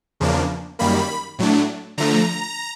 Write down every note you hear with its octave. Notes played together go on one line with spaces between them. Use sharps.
E2 C#3 F3 A#3 D4
F#2 D#3 G3 A#3 B5
A2 F#3 A3 D4
D3 F3 A3 A#5